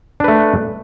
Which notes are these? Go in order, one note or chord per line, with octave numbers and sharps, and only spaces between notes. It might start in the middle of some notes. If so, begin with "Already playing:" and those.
A3 D4 B4